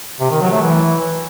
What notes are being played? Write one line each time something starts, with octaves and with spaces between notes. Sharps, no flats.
C3
D#3
F#3
A3
E3